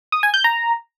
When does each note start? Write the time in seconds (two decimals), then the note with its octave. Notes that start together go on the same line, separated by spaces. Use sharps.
0.12 D#6
0.23 G#5
0.34 G6
0.44 A#5